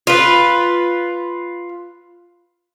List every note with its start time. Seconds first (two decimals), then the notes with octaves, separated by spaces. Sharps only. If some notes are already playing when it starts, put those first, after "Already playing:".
0.07 F4 B4